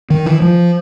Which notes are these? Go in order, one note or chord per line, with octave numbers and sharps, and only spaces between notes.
D#3
E3
F3